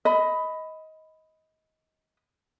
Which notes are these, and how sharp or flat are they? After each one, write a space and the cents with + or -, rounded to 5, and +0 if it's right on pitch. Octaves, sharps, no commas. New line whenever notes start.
D#5 +20 B5 +10